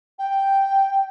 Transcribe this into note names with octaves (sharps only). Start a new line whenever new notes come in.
G5